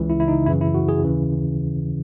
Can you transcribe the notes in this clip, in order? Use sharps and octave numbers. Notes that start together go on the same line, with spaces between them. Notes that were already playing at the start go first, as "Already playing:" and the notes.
Already playing: C#2 C#3 E3
E4
E4
D#4
F#2 C#3 E3 E4
E4
F#4
G#4
D#2 C#3 E3